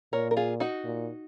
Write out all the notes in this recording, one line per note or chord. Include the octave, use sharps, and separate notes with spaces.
A#2 A#4 C#5
A#4
F4 G#4
D#4 F#4
A#2